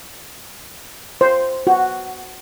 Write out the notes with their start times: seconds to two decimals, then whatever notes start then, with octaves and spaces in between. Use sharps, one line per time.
1.21 C5
1.67 F#4